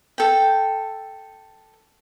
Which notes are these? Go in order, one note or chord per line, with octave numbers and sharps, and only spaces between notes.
A4 G5